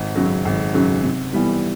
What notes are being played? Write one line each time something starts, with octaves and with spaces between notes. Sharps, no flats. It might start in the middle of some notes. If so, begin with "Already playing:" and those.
Already playing: G#1
F#2 C#3 F#3
G#1
F#2 C#3 F#3
C3
E3 G3 B3